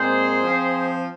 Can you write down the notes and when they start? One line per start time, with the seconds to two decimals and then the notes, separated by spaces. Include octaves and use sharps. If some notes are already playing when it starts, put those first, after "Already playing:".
Already playing: A#2 G#3 C4 G#4 C5
0.43 F3 C4